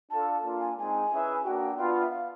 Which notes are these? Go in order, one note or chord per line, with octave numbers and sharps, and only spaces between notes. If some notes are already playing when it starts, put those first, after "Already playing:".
D4 F4 A4 A5
A#3 D4 F4
G#5
G#3 C4 D#4 G#5
C#4 E4 G#4 B4 E5
A#3 D4 F#4 G5
B3 D4 F4 G5
F#5
E5
F5